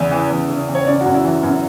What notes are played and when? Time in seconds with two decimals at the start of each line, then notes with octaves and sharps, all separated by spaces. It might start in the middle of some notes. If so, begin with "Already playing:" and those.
Already playing: E2 C#3 E5
0.11 E3
0.31 E2
0.49 C#3
0.68 E2
0.75 C#5
0.86 C#3 D5
1.01 F#4
1.05 F#2
1.14 E4
1.24 E3
1.43 F#2 C#4